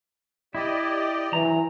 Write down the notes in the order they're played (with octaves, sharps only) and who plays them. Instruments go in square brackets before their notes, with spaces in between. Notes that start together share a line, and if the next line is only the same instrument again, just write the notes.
[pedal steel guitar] E4 [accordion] G4 D5 D#5
[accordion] G2 C3 F#3 [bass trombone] E3 [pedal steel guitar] A#5